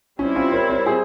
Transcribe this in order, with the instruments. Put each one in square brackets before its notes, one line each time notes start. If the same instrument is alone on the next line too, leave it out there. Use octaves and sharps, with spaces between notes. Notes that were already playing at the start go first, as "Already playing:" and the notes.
[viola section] G3 C4 E4 [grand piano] C#4
[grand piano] C#4 F4
A#4 C#5
A#4 C#5
G#4 C5